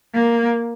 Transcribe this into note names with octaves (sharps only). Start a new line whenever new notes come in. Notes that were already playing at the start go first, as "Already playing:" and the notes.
A#3